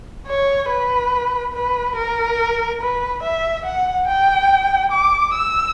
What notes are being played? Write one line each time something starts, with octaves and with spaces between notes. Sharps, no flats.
C#5
B4
B4
A#4
B4
E5
F#5
G5
D6
E6